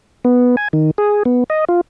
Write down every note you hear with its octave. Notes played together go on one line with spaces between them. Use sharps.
B3
G#5
D#3
G#4
B3
D#5
F4